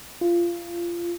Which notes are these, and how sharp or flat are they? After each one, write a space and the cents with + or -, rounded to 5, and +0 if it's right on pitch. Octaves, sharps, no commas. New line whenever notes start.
F4 -20